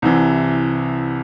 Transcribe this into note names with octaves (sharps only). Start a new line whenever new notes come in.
C2 C3 E3